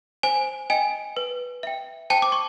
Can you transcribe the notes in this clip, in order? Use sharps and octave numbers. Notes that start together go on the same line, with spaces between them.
C5 G#5
D#5 G5 G#5
B4
E5 G5
C5 G5 A5
D6
C#6